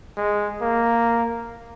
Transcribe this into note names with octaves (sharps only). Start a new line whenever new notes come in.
G#3
A#3